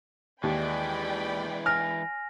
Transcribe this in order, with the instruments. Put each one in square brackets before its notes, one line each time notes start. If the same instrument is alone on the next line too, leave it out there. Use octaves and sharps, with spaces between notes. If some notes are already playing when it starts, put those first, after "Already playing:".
[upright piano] D#2 [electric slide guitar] E3 G#3 [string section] D5 G5 B5
[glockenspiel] G#5 A#6 [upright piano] F6